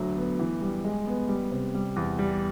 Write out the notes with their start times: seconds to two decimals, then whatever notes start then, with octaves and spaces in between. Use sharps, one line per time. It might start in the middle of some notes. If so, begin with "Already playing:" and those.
Already playing: D2 F#3
0.16 B3
0.39 E3
0.61 G3
0.84 G#3
1.07 B3
1.28 G3
1.51 C3
1.74 G3
1.96 E2
2.19 G3